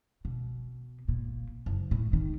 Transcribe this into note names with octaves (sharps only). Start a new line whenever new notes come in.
B2
A#2
F#1
A2
D#3